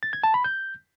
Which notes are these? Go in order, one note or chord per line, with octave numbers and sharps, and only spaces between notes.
A6
G#6
A5
B5
G6